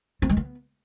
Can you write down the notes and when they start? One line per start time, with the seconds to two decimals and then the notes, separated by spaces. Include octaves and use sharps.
0.22 C4
0.30 G#3
0.37 B3